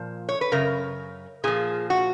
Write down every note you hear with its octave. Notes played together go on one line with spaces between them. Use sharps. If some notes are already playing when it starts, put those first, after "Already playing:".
Already playing: A#2 F3
C#5
B4
F#2 C#3 A#4
A#2 F3 G#4
F#4